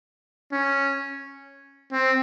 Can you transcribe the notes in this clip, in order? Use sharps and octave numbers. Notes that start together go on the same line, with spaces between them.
C#4
C4